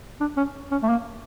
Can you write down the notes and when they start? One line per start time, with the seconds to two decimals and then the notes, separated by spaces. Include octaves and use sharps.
0.21 D4
0.37 C#4
0.72 C#4
0.83 A3
0.89 A#3